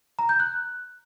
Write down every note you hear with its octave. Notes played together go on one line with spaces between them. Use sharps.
A#5
G6
F#6